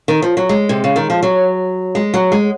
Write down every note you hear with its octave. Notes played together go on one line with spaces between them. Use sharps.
D#3
F3
F#3
G#3
C3
C#3
D#3
F3
F#3
G#3
F#3
G#3